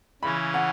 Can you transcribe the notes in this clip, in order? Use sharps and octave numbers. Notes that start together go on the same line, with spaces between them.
C#3 E3 C#4 B5
F#5